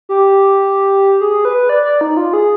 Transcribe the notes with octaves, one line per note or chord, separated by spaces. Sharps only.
G4
G#4
B4
D5
D5
D#4
F4
G#4